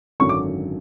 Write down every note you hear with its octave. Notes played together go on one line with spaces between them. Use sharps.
G#1 F#2 D3 F#3 C#6
D6